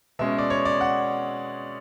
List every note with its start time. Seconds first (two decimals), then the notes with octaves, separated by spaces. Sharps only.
0.19 B2 G#3 C#4 E5
0.38 D5
0.50 C#5
0.65 D5
0.81 F#5